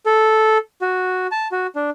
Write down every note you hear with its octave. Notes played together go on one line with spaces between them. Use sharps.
A4
F#4
A5
F#4
D4